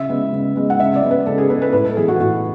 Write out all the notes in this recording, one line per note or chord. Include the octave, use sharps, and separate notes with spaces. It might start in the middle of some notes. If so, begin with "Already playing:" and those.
Already playing: C#3 E5
G#3 B3
C#3
G#3 B3
F#5
C#3 E5
D5
G#3 B3
B4
C#3 A4
G#4
B3 B4
G#3
B4
A2 B4
A4
E3 B3 G#4
F#4
A2 F#4